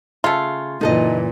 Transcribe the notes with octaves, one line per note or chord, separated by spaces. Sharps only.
C#3 A3 F4
F#1 A#2 E3 D#4 A4 D#5